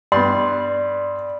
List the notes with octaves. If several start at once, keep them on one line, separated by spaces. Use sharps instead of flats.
G2 B3 D5 C6